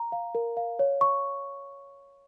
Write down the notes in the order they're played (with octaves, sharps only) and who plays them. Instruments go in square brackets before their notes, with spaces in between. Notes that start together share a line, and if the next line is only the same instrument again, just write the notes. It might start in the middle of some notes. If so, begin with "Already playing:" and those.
Already playing: [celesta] A#5
F5
A#4
F5
C#5
C#6